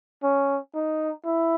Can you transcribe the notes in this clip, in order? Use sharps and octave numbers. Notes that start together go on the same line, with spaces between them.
C#4
D#4
E4